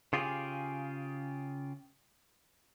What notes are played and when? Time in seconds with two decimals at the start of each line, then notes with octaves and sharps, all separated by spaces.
0.13 C#3 F4 G4 G#4